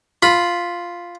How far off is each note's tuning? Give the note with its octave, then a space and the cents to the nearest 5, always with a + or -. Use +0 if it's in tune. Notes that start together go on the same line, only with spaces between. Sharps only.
F4 +0 B5 +0